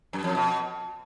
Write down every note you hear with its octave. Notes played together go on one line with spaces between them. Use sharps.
F#2
F2
B2